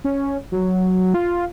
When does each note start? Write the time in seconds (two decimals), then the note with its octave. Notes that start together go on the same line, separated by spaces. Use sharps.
0.04 C#4
0.52 F#3
1.14 F4